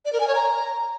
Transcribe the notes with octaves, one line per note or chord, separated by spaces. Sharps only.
D5
A#4
G#5
C#5
A#5